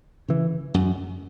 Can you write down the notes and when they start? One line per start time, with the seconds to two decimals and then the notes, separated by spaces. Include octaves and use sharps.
0.28 C#3 E3
0.74 F#2